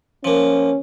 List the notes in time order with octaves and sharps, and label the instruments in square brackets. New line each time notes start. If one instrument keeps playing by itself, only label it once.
[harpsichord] F3 A#3 [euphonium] C#4